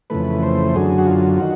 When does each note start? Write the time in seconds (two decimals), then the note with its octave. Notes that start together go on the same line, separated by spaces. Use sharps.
0.10 F2 C#3 E3 A3 B4
0.43 C5
0.75 F#2 D3 F#3 G#4
0.98 F#4
1.07 F4
1.40 D#3 F#4